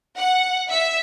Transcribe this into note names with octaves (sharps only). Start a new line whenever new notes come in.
F#5
E5